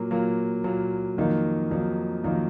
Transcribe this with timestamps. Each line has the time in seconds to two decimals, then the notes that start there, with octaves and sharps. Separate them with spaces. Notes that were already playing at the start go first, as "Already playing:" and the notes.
Already playing: A#2 F#3 A#3
0.11 A#2 F#3 A#3
0.64 A#2 F#3 A#3
1.17 F2 D#3 F#3 A#3 D#4
1.71 F2 D#3 F#3 A#3 D#4
2.24 F2 D#3 F#3 A#3 D#4